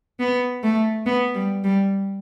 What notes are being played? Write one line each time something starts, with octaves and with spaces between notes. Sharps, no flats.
B3
A3
B3
G3
G3